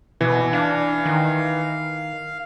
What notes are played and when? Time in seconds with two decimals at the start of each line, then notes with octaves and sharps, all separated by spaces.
0.21 B2 E3
0.53 D4 F5
1.06 D#3